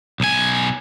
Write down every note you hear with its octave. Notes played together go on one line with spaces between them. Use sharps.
B1 G#5